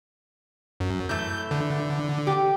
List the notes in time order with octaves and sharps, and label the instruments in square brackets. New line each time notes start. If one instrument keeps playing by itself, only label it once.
[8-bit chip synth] F#2
[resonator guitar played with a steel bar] E3 A3 [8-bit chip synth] G6
[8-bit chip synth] D3
[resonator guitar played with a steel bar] G4